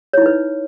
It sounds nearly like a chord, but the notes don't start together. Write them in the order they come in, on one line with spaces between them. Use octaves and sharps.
C#5 E4 D#4 B4